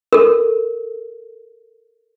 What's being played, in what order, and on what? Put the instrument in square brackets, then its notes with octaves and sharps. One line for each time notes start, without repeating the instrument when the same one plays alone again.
[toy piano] A4 A#4